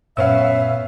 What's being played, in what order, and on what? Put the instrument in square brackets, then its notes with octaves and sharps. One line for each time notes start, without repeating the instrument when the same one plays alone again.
[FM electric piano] F#2 E6 [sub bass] A#2 [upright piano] B3 C#4 F5 [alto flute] E5